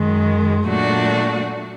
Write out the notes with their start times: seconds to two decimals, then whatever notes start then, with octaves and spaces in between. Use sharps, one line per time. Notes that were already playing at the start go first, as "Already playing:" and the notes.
Already playing: F#2 D#3 G#3
0.65 A#2 F#3 A3 D4 F#4